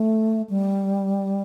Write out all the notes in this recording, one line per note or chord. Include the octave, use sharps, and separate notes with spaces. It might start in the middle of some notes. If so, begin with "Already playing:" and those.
Already playing: A3
G3